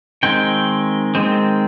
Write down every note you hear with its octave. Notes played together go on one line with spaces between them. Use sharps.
D#3 G#3 C4 G5
D#3 G#3 C4